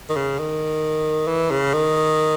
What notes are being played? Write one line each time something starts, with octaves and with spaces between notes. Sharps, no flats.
D#3
C#3
D#3
E3
C#3
D#3